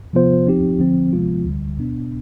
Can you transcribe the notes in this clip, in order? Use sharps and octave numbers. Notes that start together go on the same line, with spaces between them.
C3 F3 B3 F4 C5
F3 C4 D#4 G4
D3 F3 C4
C3 F3 G#3 B3 F4
D2 D3 G3
B2 B3 D4